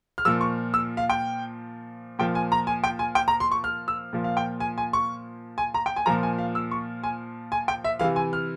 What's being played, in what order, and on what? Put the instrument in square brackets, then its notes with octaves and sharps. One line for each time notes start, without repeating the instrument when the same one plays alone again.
[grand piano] F6
A#2 F3 E6
C#6
E6
F5
G5
A#2 F3 G5
G#5
A#5
G#5
G5
G#5
G5
A#5
C6
C#6
F6
E6
A#2 F3
F5
G5
G#5
G#5
C#6
G#5
A#5
G5
G#5
A#2 F3 A#5
G#5
F5
E6
C#6
G#5
G#5
G5
E5
C3 E3 F5
G#5
F6